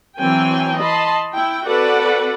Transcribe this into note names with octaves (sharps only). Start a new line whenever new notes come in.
E3 F#3 C4 G5 G#5
D#5 A5 B5 C6
E4 G5
C4 F#4 A4 B4 D5 F#5